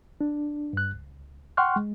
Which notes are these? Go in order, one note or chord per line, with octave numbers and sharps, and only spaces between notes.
D4
G2 F#6
C#2
F#5 G5 C6 C#6 F6 F#6
G#3